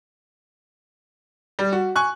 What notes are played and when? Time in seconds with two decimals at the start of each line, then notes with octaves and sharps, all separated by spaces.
1.59 G3
1.72 F#4
1.96 G#5 C#6 F#6